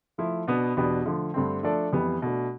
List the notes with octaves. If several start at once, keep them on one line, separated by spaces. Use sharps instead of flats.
F3 A3 E4
B2 B3 D4
E2 B2 B3 D4 G4
D3 F3 A3
G2 D3 A3 C4
F3 A3 D4 A4 D5
F2 E3 G3 B3
B2 A3 D4